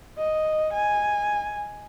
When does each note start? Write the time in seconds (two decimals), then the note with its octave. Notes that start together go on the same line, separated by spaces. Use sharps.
0.18 D#5
0.73 G#5